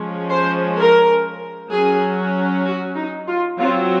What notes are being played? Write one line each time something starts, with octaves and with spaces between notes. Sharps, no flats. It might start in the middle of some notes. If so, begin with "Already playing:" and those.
Already playing: F3 G#3 C#4
C5
A#4
F#3 C#4 G#4
F#4
D#4
F4
F#3 C4 F4